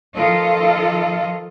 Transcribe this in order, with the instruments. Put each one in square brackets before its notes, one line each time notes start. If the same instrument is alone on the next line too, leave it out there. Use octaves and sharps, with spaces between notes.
[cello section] D#3 F3 F4 A4 D#5